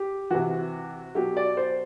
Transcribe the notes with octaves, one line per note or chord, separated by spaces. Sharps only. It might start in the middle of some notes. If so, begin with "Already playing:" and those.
Already playing: G4
C3 E3 F#4
B2 F#3 G4
D5
C5